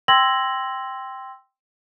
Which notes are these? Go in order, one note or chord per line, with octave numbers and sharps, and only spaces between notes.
G5 C6 E6 G#6 A#6 F#7